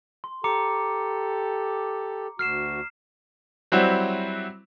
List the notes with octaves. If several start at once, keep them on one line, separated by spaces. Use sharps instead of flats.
C6
G4 A4 A#5 D6 C#7
D2 F#4 F6 C7 E7
F#3 G3 C4 E4 F#4